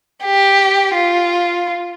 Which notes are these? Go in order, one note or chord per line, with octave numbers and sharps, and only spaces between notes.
G4
F4